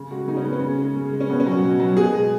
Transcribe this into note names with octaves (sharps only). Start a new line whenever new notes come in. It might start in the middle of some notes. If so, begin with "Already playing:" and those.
Already playing: C#3
G#3 F#4
C#3 D#4
C#4
G#3 B3
C#4
C#3
G#3
C#3
G#3
C#4
B2 B3
C#4
F#3
F#4
B2
F#3
B2 G#4
G#3